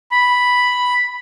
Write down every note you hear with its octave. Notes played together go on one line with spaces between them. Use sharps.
B5